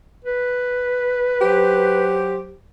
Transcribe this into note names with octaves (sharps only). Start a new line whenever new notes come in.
B4
F#3 G4 C5